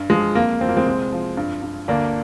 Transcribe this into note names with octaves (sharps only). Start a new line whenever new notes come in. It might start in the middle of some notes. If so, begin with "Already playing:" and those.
Already playing: G2
F3 G#3
F2 A#3
F3 C4
A#3
G#3 C4
C2
F3
G2
G2
D2 A#3 D4